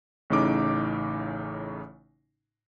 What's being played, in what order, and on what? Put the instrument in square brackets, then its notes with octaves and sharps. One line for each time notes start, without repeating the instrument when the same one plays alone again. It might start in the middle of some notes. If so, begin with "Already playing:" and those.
[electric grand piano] A1 A2 C#3 D#4 D6